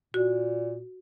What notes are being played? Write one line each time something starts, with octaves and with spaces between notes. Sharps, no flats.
A#2 F#4